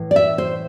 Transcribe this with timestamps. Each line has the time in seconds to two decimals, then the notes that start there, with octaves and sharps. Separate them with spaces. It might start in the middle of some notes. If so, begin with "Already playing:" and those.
Already playing: A2 E3
0.11 D5
0.16 E5
0.38 C5